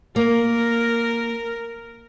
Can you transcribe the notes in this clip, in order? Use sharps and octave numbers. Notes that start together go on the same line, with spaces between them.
A#3 A#4